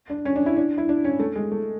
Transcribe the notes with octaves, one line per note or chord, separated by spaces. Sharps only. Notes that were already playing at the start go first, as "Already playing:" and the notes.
D4
C#4
D4
E4
D4
E4
D4
C#4
A3
G#3
A3